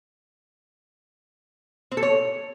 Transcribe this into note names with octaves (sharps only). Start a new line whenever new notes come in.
C4
A4
C#5